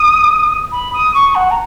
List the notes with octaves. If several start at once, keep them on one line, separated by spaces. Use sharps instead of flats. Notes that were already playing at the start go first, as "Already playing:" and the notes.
Already playing: D#6
B5
D#6
C#6
F#5
A#5